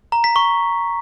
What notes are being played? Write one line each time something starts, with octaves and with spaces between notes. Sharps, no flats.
A#5
B6
C#6